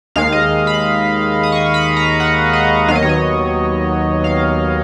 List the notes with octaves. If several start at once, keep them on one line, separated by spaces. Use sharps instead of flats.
D#2 D#3 G#3 F5
D#5
B5
D#6
C#6
B5
A#5
F#5
D#5
D#2 D#3 F#3 B3 F5
D#5
C#5
D#5
F5